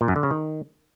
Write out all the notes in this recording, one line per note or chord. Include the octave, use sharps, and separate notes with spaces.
A#2
F#2
D3
C#3
D#3